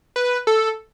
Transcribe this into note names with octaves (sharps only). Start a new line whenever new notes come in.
B4
A4